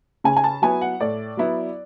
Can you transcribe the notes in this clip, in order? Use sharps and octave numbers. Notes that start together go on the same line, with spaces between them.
C#3 G#5
G#5
A5
F#3 B3 E4 G#5
F#5
A2 D5
F#3 B3 E4